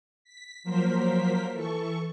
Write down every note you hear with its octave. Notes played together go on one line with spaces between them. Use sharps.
B6
F3 F#3 A#3 A#4 C5 B6
E3 A4 C#6